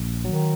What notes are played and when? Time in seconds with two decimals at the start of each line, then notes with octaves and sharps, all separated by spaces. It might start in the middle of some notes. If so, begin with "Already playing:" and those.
Already playing: A#1
0.25 D#3 F#3